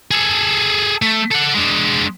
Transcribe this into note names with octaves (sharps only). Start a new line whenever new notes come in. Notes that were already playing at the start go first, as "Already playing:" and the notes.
G#4 A4
A3
A4 F#5
G#3 D4